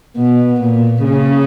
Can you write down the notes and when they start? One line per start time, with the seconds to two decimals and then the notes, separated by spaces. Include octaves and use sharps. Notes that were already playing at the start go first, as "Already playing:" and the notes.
0.17 B2
0.60 A#2
1.04 C#3